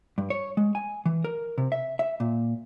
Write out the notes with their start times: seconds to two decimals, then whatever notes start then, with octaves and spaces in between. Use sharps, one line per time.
0.18 G2
0.30 C#5
0.57 G#3
0.75 G#5
1.06 E3
1.24 A#4
1.58 C3
1.72 E5
1.99 E5
2.20 A#2